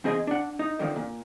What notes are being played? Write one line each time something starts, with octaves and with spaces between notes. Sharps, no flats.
E2 C4 G#4 D#5 F5 G#5
D4 F#5
D#4
D3 D#3 F3 C4
A#2